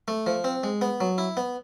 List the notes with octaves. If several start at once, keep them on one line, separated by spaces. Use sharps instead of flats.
A3
F3
C4
G#3
B3
F#3
E4
B3